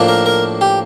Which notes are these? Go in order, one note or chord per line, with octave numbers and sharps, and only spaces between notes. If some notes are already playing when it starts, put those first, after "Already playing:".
Already playing: A2 F3 A#3 D4
A#4
A#4
G4